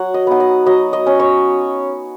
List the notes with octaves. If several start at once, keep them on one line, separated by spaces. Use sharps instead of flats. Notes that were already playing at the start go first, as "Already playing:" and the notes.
Already playing: F#3 F#5
D#5
B3 D#4 F#5
D#5
F#3 D#5
D#5
C#4
C#5